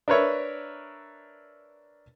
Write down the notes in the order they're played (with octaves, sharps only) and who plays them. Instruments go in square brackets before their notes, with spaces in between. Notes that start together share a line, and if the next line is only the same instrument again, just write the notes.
[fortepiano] D4 A#4 B4 C#5 E5